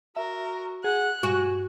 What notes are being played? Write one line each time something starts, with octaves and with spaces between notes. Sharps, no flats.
F#4 A#4 E5
G#4 F#5 F#6
G2 F#4 G#5